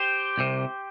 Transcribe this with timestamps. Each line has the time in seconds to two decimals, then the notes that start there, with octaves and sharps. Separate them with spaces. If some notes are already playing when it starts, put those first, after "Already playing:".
Already playing: G4 C5
0.38 C2 C3